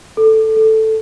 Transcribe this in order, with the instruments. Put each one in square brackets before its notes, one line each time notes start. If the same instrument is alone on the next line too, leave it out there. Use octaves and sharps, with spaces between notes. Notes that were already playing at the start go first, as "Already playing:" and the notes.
[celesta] A4
A4